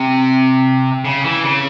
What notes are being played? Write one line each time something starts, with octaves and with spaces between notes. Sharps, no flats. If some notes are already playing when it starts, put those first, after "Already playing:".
Already playing: C3
C#3
E3
C#3